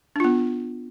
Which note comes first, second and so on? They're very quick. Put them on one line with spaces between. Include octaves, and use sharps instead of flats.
D4 F4 B3